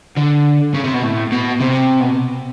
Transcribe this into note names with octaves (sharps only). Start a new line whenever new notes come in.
D3
C#3
C3
B2
A2
B2
C3
B2